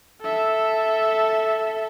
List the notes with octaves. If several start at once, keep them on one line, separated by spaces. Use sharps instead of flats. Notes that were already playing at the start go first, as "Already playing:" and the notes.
A4 E5